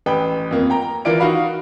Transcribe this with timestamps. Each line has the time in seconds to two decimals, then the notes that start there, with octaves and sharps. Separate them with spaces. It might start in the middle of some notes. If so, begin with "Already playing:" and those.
0.06 A1 B4 G5
0.51 F2 A#3
0.70 G5 A#5
1.05 E3 F4 A#4 D5 D7
1.19 D#4 F#4 F5 B5